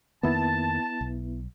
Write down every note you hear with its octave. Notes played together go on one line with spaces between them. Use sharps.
F2 D#3 A#3 B3 E4 A5
B1